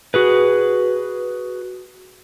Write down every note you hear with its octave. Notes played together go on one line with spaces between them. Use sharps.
F#4 G#4 B4